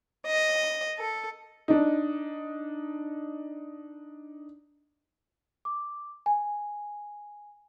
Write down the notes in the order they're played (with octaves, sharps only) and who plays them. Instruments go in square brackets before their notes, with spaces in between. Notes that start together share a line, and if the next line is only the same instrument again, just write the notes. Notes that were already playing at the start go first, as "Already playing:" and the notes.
[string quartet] D#5
A4
[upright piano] D4 D#4
[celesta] D6
G#5